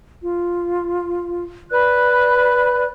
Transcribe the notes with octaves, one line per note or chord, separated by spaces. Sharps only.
F4
B4 D5 B5 F#6